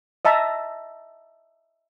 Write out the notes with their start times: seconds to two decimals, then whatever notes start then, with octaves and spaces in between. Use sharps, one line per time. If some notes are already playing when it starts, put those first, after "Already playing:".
0.25 D#5 E5 A5 A#5